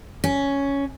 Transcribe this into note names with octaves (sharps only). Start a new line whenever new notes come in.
C#4